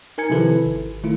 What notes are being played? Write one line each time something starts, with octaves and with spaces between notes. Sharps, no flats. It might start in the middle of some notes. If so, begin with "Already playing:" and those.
D#4 A#4 G#5 G#6 C#7
C3 D#3 F3 E4 A4 B4
G#1
D#3 A3 E4 F4